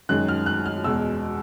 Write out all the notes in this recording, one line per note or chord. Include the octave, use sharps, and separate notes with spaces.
F#2 D#3 G#3 F#6
F6
F#6
F6
E2 B2 G#3 E6